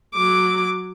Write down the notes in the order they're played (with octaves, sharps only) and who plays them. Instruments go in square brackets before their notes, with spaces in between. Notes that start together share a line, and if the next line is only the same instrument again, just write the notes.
[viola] F#3 D6